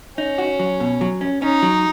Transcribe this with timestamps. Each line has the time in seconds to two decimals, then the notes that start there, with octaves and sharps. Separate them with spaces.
0.18 C#4 D#4
0.38 F#4
0.59 F#3
0.80 B2
1.01 F#3
1.21 C#4
1.42 C#4 D#4
1.62 F#3